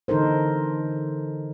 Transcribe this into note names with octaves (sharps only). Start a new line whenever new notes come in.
D3 E3 D#4 A4 A#4 C5